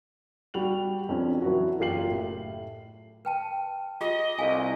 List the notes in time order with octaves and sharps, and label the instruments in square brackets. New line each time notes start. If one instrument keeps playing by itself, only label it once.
[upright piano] G3 F#4 F7 F#7
F2 F3 C#4 D4
E3 F#3 F#4
F#1 F4 G4 C7 F#7
A2
[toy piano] B4 G5 A5
[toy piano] F4 G4 G#4 [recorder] D#5
[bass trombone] C2 [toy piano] A4 F5 G#5